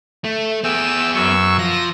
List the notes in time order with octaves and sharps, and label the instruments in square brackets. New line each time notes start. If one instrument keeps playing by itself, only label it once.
[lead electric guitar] A3
[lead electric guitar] B3 G#4 [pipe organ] G5 E6
[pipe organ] F#2 C#6 E6
[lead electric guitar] F3 [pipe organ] A#6